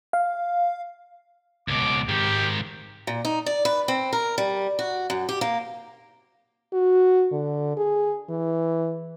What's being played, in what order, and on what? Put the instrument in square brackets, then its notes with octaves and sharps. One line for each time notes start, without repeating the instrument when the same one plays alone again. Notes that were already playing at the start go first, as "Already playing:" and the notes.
[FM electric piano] F5
[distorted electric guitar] C#2 B2 [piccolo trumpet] D6
[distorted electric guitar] G#2 D#3 [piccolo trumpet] G4
[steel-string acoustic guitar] A#2
D#4
D5
B4
C4
A#4
G3
F#4
F#2
G4
A#3
[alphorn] F#4
D3
G#4
E3